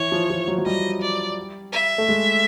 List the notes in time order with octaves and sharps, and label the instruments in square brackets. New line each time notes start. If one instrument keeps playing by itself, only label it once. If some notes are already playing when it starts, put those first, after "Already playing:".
Already playing: [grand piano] E3 [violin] C#5
[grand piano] F3
F3
F#3
F#3
[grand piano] G3 [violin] D#5
[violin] D5
E5
[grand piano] A3
G#3